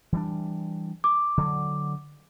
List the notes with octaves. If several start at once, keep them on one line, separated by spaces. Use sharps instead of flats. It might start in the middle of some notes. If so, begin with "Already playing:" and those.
E3 G3 D4
D6
D3 F#3